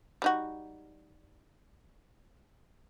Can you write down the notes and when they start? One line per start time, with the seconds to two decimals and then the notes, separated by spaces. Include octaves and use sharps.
0.22 G3 D#4 F#4